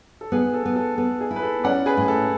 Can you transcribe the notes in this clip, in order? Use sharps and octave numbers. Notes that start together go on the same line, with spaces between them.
A4
B3 G#4
A4
B3
A4
B3 A4
G#4
E4
B4
A4
C#4 D5 F#5
G#4 B4
A2
A4